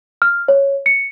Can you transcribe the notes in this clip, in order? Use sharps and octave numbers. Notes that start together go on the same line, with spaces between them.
F6
C#5
C#7